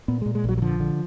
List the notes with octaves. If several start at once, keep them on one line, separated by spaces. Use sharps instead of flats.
A#2 B3
A#2 G#3
G#3
A#1 F#3
F#3
D3 F3
D3